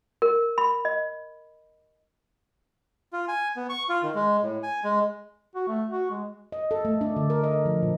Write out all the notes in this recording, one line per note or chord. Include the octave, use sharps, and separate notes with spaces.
A#4
B5
D#5
F4
G#5
B3
C#6
F4
D#3
G#3
A2
G#5
G#3
F#4
A3
F#4
G#3
D#5
A4
A3
D4
D3
A#4
D#5
F3
A#2